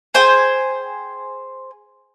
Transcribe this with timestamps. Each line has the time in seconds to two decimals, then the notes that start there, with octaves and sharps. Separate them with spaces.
0.14 G#4 C5 G5 G#5